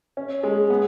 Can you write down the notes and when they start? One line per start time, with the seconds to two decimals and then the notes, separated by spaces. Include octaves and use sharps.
0.17 C#4
0.43 G#3
0.70 B3